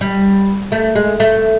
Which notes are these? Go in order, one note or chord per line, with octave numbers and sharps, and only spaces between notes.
G3
A3
G#3
A3